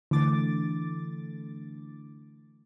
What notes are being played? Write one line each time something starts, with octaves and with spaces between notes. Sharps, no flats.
D3 E3 A3 D6 A6